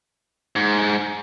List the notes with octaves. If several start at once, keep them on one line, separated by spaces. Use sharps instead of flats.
G#2